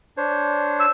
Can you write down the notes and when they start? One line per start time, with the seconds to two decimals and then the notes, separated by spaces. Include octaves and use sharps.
0.17 D4 C5 C#5
0.80 E6